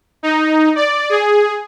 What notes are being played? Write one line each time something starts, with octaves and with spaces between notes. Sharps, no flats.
D#4
D5
G#4